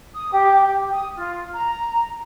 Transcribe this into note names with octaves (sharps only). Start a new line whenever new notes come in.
D#6
G4
G4
D#6
F4
A#5